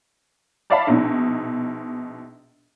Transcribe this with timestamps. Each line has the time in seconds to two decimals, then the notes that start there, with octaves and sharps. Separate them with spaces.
0.70 C#5 D5 E5 F5 A5 B5
0.87 A#1 B2 D#4